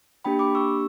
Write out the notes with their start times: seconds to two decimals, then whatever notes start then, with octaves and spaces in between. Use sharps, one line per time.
0.25 A#3 D4 G4 G5 B5
0.39 B5 D6
0.55 C#6 E6